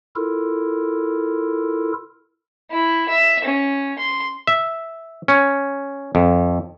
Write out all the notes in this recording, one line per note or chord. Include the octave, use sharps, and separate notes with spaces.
E4 F4 A4 A#4
E4
E5
C#4
C6
E5
C#4
F2